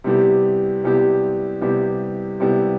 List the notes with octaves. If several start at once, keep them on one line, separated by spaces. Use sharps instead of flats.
C3 G3 B3 E4 G4
C3 G3 B3 E4 G4
C3 G3 B3 E4 G4
C3 G3 B3 E4 G4